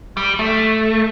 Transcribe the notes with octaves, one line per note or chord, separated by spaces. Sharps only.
G3
A3